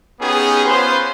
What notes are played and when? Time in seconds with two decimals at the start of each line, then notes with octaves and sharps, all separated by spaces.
0.20 B3 C#4 D#4 G4 G#4
0.66 B3 C#4 F4 B4 C5 C6